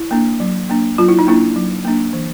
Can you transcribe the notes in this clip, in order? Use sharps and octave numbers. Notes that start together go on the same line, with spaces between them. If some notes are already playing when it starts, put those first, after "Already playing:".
Already playing: E4
A#3 D4
F#3
A#3 D4
F#3 F4
E4
D#4
A#3 D4 E4
F#3
A#3 D4
E3